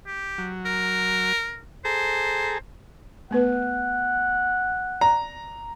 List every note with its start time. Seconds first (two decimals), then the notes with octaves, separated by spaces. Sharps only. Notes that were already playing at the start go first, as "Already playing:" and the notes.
0.06 G4
0.38 F#3
0.65 A#4
1.85 G#4 A4 C5 A#5
3.31 A3 B3 B4 F#5
5.01 D5 A#5